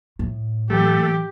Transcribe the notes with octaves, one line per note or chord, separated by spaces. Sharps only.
A2
E3 F#3 A3 G4